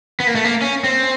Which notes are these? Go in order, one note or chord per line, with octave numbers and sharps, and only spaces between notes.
B3
A#3
A3
A#3
C#4
C4